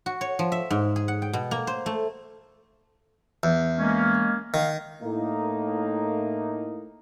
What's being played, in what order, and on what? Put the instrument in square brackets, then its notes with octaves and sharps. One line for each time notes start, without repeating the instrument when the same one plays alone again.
[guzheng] F#4
C#5
F3
E5
G#2
G#4
F#5
G5
B2
A#3
C5
A3
[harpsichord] E2
[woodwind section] G#3 A#3 C#4
[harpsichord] D#3 [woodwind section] F5
[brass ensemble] A2 A#3 D#4